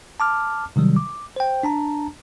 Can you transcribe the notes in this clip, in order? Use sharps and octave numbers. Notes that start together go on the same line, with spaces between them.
A5 D6 F6
C3 D#3 F#3 G3
D6
C5 G5
D4 A5 A#5